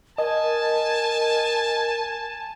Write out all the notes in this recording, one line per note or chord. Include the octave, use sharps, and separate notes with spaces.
A#4 D#5 G#5 A5